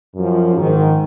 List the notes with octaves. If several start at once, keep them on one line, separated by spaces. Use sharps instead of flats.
F#2 F3
G#2 D#3